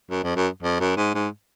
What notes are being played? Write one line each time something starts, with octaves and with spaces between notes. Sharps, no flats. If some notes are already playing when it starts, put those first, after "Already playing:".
F#2
F2
F#2
F2
F#2
G#2
G#2